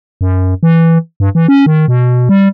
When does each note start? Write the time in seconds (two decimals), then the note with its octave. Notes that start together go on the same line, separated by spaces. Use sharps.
0.21 F#2
0.63 E3
1.20 G2
1.35 E3
1.48 C#4
1.66 D#3
1.88 B2
2.29 G3